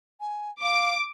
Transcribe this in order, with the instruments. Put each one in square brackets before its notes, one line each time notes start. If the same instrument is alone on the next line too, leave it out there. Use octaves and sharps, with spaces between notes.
[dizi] G#5
[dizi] F5 [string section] D6